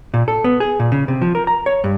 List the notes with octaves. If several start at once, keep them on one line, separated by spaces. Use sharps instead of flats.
A#2
A4
B3
G#4
A#2
C#3
C3
F3
A#4
A#5
C#5
G2